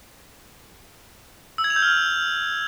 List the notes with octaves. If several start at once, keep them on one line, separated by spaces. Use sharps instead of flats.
E6
G#6
F7
G6
F6